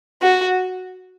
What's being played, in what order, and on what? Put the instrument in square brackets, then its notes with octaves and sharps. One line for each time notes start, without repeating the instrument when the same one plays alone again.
[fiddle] F#4